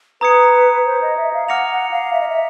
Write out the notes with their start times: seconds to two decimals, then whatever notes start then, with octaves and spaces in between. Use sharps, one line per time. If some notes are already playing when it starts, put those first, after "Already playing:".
0.21 B4 A#5 D#6 G#6 C#7
0.86 C5
1.02 D#5
1.17 E5
1.33 F5
1.49 F#5 D6 F6 A#6 C#7 F7
1.70 F#5
1.91 F5
2.13 E5
2.21 D#5
2.28 E5